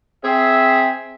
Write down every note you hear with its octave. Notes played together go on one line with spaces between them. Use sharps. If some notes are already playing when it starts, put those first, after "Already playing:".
C4 G#4 E5